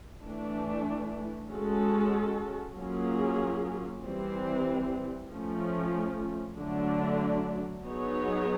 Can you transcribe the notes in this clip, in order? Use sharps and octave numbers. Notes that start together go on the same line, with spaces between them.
E3 A3 D4
G#3 C#4 F#4 A4
F#3 A#3 C#4 F4 G#4
E3 G3 C4
F3 A3 C#4
D3 F#3 A3 D4
F#3 B3 D#4 G#4 C#5